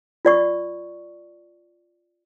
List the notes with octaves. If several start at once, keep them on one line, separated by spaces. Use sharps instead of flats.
F4 D5 C#6